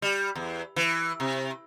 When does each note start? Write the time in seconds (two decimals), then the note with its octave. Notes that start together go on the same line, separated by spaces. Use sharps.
0.02 G3
0.35 E2
0.76 E3
1.20 C3